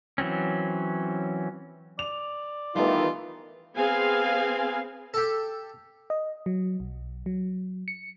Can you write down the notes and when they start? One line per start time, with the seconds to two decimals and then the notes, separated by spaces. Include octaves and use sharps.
0.18 E3 F#3 C4 C#4
1.99 D5 F7
2.76 D#3 E3 G3 A3 B3 F4
3.76 B3 C4 G#4 F5 G#5
5.14 G4 A4
6.10 D#5
6.46 F#3
6.80 B1
7.26 F#3
7.88 C#7